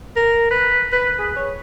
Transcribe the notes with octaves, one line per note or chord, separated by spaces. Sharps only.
A#4
B4
B4
G#4
C#5